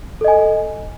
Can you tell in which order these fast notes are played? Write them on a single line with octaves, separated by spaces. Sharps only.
A4 D#5 G#5